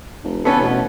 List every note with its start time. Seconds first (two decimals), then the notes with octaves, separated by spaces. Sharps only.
0.23 F1
0.45 D3 B3 C#4 A4 B4
0.59 A1 B2